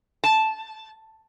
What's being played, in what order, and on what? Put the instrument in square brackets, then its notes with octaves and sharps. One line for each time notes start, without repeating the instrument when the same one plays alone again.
[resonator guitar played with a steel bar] A5